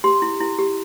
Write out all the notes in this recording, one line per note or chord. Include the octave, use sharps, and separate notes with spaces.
G4 C6
E4
E4
G4